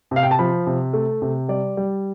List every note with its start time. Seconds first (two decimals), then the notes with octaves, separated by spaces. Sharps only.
0.11 C3 F5
0.23 G5
0.31 A5
0.39 F3 B5
0.67 C3
0.93 A3
1.22 C3
1.48 G3 D5
1.77 G3